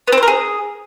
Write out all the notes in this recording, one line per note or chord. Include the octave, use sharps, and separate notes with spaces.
B3
C4
C5
A#4
G#4